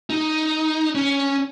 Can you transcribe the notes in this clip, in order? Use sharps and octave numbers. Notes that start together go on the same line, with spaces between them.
D#4
C#4